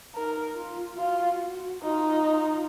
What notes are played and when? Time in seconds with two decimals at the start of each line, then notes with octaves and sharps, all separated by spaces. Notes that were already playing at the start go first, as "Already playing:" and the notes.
0.15 D#4 A#4
0.57 F4
0.98 F4 F#4
1.83 D#4 F4
2.25 F4